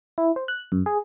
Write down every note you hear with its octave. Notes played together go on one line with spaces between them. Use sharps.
E4
C5
F#6
F#2
G#4